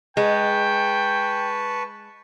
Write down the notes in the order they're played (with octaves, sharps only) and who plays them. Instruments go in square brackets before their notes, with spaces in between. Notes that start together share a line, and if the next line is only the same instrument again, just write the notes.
[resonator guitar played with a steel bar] G#3 [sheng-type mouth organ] B4 A5 C#6 [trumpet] G5